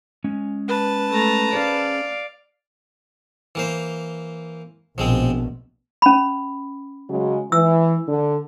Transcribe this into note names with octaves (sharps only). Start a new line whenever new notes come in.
G#3 C#4
B4 A5
A3 A#5
C#4 G#4 C5 D5 F5
E3 A#3 C5
A#1 B2 F3 G#3 C4
C#4 B5
C#3 F#3 G#3
E3 E6
D3